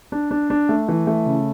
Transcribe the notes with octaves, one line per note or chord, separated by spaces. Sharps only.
D4
D4
D4
A3
E3
A3
C#3